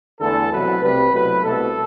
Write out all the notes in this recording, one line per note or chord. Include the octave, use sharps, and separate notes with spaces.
E2 D3 A3 A4
C2 B2 F#3 A3 B4
C2 C3 G3 B4
C2 B2 F#3 A3 B4
C2 B2 A3 A4